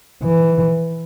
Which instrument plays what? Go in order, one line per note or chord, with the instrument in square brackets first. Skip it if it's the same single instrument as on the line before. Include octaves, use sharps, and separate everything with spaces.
[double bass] E3